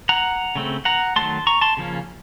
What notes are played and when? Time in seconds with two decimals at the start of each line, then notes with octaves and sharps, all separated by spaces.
0.09 F#5 A#5
0.55 C#3 A3 C4
0.85 F#5 A#5
1.16 D#3 F#3 A3 A5 C6
1.47 A#5 C#6
1.61 A5 C6
1.77 C#3 F3 A#3 C#4